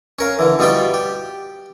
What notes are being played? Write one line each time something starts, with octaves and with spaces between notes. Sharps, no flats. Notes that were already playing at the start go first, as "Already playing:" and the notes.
C#4 A#4 F5
D3 E3
B2 G3 F4 G4 G5
G4